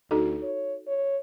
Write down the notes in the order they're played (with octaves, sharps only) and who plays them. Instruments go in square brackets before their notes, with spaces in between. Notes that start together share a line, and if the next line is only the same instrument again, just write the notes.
[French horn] D2 [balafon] D#4 F#4 A4
[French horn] C#5
C#5